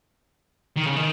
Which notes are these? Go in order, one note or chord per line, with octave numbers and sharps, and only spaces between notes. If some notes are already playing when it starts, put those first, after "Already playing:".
D#3
C#3
D#3